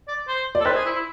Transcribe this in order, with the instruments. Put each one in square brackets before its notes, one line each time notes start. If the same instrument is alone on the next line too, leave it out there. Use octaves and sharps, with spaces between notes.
[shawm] D5
C5
[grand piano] D5
[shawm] A4
[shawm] B4 [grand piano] C5
[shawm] G#4
E4
E4